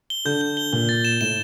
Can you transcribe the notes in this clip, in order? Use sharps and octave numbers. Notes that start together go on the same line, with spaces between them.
G7
D3 G6
G7
G7
A#2 G7
A6
E7
A2 E7